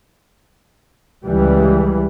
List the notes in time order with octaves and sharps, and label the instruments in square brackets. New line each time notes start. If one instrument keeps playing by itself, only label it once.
[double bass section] C#2 E3 G3